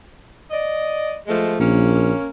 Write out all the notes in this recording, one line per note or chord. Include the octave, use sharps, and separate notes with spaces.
D5 D#5
F3 G#3 A3
A#1 A#3 C#4